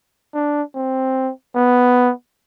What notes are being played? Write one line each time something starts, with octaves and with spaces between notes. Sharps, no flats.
D4
C4
B3